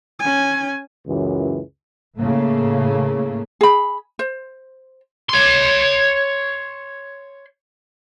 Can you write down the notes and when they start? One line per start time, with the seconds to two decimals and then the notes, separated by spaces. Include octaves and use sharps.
0.20 C#4 G#5
1.06 C#2 F#2 E3
2.17 A2 C#3 A3 A#3
3.61 G#4 B5
4.19 C5
5.29 C#5 C6